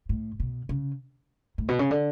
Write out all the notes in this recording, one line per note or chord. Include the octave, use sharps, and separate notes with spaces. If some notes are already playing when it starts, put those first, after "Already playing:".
A2
B2
C#3
A2
B2
C#3
D3